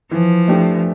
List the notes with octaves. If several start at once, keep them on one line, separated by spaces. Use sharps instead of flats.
E3 F3
A3 D4 G4